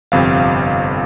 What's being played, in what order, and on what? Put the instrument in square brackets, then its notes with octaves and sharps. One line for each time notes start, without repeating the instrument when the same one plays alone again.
[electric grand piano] G1 F2 C3 F5